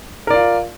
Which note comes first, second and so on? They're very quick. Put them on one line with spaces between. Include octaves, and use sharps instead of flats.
A#4 D5 F4